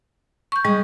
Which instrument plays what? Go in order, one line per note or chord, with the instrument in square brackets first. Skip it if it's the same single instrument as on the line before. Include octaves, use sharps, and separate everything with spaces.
[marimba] C#6 G6
[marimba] G3 [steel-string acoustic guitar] G#3